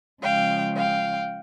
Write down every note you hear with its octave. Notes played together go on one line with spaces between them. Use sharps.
C#3 F3 G#3 F5 G5
F5 G5